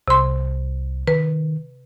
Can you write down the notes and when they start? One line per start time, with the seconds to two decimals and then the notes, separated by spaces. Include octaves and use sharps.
0.08 C2 C3 C6
1.07 D#3 B4